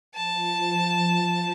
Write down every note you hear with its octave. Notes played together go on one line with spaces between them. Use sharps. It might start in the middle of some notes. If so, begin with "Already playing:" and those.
F3 A5